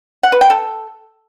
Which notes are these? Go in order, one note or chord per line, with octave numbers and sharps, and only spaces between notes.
F#5
B4
G5
A4